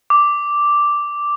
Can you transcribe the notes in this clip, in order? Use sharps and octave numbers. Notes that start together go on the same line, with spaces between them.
D6